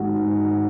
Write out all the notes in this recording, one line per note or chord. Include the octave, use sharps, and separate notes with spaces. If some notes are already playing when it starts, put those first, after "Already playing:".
Already playing: G#2 D#3 G#3 F#4
G#2